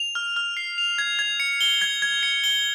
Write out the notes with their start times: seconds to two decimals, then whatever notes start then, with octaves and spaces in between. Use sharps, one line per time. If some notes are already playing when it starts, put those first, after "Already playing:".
Already playing: F7
0.15 F6
0.36 F6
0.57 C7
0.78 F7
0.98 G#6
1.19 G#6
1.40 C#7
1.61 G7
1.82 G#6
2.02 G#6
2.23 C#7
2.44 G7